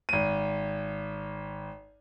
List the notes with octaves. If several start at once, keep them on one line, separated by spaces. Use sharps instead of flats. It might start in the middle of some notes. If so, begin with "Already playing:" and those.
G#1 D#7